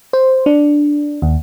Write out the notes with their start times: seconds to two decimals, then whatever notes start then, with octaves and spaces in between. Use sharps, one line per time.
0.13 C5
0.46 D4
1.22 D#2